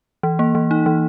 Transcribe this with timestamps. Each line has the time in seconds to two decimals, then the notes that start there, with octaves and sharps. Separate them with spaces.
0.23 E3
0.39 A#3
0.55 E3
0.71 D#4
0.86 E3